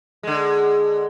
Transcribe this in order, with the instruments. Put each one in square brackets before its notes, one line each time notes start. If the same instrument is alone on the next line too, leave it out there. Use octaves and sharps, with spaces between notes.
[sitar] D3 G#3